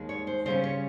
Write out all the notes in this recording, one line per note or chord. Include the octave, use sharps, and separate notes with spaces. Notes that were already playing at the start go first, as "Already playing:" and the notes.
Already playing: D#2 D#3 G#3
C#5
C5
C#3 G3 C#4 C5
C#5